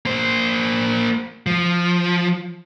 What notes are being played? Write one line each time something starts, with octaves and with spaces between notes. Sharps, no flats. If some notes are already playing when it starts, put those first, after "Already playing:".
A#3 C5
F3